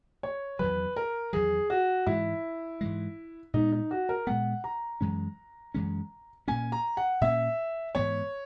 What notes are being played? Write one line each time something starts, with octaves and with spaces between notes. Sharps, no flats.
C#5
E2 D#3 F#3 B4
A#4
E2 D#3 F#3 G#4
F#4
G#2 E3 G#3 E4
G#2 E3 G#3
A#2 G#3 B3 D#4
D#4
F#4
A#4
A#2 G#3 B3 F#5
A#5
F#2 E3 G#3 C#4
F#2 E3 G#3 C#4
A#2 A#3 C#4 G#5
A#5
F#5
A#2 A#3 C#4 E5
G#2 E3 B3 C#5